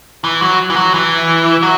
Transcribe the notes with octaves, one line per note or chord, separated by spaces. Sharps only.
E3
F#3
E3
F#3
E3
F#3